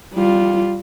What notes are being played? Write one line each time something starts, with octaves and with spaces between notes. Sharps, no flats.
G3 F4